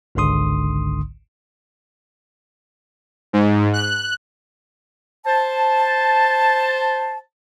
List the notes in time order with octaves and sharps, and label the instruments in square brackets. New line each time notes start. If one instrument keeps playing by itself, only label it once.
[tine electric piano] G#1 C#2 G#2 D3 C6 D#6
[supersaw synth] G#2
F#6
[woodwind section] C5 A5